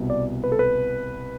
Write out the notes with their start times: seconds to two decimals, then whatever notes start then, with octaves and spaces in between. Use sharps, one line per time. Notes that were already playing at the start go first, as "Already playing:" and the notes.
Already playing: C2 B2
0.10 D5
0.44 B4
0.52 A4
0.59 B4